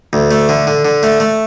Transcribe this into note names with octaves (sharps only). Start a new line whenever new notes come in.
D2
A3
D3
D3
D3
A3
A3